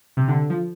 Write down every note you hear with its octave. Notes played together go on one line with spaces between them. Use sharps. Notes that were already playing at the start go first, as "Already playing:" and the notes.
C3
D3
F3